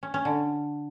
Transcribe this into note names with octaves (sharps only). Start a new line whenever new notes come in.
C#4
C#4
D3